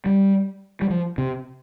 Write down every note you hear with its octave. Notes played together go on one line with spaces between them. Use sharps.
G3
G3
F3
C3